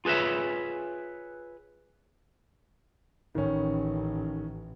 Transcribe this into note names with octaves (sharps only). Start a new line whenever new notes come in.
F4 G#4 B4 C#5 E5
A1 D#3 C#4